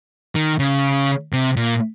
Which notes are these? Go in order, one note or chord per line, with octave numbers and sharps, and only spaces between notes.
D#3
C#3
C3
A#2